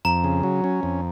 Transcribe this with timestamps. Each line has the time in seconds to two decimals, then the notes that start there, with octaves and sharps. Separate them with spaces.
0.05 F2 A#5
0.24 C#3
0.43 F#3
0.64 C#4
0.83 F2